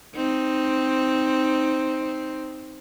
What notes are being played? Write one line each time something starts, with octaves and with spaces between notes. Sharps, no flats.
C4 D#4